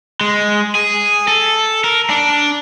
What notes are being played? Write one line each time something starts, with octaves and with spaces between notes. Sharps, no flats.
G#3
G#4
A4
A#4
D4